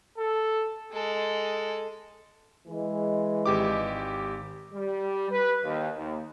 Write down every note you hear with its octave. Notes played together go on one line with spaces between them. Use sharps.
A4
G#3 A4
E3 G#3
G#1 G4 D6
G3
B4
D#2
D#2